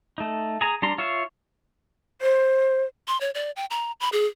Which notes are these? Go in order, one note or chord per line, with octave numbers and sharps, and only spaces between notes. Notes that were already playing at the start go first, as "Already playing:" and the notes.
A3 D#4
G#4 A#5
G3 D4 A#5 C6
F4 C#5 E5 F5
C5
C6
C#5
D5
G5
A#5
B5
G#4